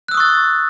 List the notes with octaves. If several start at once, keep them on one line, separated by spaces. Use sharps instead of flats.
C#6 D#6 E6 F#6 A6